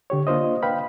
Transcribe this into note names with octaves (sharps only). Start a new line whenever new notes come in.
D3 G4 C#5
A#3 D4 F4 C5 D#5
B4 F5 G5 B5